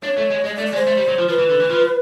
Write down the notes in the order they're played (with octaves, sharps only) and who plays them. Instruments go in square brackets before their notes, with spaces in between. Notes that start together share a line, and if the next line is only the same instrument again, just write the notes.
[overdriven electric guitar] D4 [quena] C#5
[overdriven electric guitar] A3
G#3
[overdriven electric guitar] G#3 [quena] D#5
[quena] D5
[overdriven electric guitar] A3
[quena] D5
[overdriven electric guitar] G#3
[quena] C5
[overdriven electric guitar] A3
G3
F#3
F3
[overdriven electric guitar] F3 [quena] B4
[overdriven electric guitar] E3
D3
E3
F3